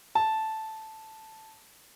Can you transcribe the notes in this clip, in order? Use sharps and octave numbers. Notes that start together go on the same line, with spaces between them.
A5